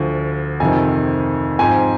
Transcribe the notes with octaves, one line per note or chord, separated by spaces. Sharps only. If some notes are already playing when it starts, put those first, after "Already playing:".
Already playing: D2 D3 F3
F2 C3 D#3 G#5
G#2 F3 C4 G#5